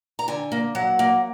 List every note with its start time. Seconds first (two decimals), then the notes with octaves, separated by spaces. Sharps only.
0.19 A#5
0.28 D3 G#5
0.52 A#3
0.75 F#3 F#5
0.99 A#3